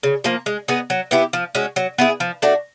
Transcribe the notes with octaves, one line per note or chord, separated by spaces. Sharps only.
C#3
F3 A#3
G#3
B3 D#4 G#4
F#3
B3 E4 G4
F3
G#3 C#4 F#4
F#3
B3 E4 G#4
F3
A3 D4 F#4